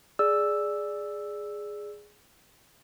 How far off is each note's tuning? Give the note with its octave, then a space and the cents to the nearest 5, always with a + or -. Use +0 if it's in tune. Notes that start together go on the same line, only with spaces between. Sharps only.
G#4 +0 D5 +0 E6 +0